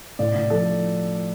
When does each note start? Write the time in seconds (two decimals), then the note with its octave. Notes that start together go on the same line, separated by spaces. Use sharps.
0.19 A2 D5
0.35 A2
0.50 F3 A4